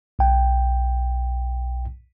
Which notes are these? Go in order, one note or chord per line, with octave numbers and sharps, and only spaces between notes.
B1 G5